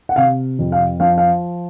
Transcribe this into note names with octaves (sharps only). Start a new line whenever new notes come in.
F#5
C3 F5
F2
F5
F3 F5
F5